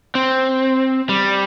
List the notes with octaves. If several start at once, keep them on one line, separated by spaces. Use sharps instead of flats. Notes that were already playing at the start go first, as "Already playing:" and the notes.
C4
G3